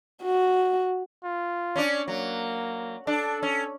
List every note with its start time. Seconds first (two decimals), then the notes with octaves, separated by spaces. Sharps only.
0.23 F#4
1.24 F4
1.76 C#4 D4 D5
2.08 F#3 A#3
3.07 D4 A4
3.43 C#4